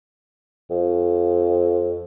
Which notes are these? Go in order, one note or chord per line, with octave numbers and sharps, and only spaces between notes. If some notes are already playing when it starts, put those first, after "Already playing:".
F2